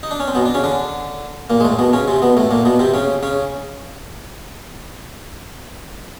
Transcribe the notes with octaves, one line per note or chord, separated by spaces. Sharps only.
D#4
D4
C#4
C4
B2 B3
D4
C#3 C#4
D3 D4
A#2 A#3
G#3
A2 A3
B2 B3
C#3 C#4
C3 C4
B2 B3
A2 A3
A#2 A#3
B2 B3
C3 C4
C#3 C#4
C#3 C#4